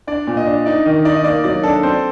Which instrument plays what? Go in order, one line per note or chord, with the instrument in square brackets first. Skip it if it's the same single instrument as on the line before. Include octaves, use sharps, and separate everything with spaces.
[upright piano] D4 [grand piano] D5
[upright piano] A#2
[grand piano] D#5
[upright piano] D4
[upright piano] D#4 [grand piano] D5
[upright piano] D#3 [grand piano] D#5
[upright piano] D#4 [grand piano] D5
[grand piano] D#5
[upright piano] A#3 [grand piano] D5
[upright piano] F#3 [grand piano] D5
[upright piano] D4 [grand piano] A4
[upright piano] C4 [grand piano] C5